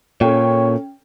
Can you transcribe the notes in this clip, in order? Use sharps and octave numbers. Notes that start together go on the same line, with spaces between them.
A#2 C#4 A4 C#5 G5